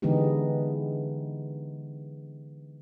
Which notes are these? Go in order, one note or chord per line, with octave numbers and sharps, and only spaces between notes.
D3 E3 G#3 B3 D#4 G4